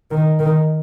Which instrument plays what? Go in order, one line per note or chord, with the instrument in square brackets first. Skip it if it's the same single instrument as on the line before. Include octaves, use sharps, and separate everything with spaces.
[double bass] D#3
D#3